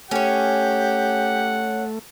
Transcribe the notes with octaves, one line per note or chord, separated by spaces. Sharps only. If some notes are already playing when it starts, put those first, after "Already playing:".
A3 C#4 G4 C#5 F#5